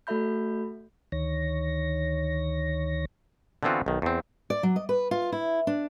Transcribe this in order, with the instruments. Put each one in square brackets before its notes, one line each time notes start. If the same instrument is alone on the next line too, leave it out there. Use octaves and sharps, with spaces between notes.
[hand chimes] A3 F#4 A4 E5 B5 G6
[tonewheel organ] D2 D#3 C#5 A#6
[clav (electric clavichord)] D3 E3 B3 C4 F4 F#4
B1 D#3
E2 C4
[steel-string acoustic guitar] D5
F#3
D#5
B4
F4
E4
D4